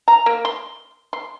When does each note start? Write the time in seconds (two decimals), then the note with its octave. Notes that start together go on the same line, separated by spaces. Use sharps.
0.08 A#5
0.26 A#3
0.45 C6
1.13 C6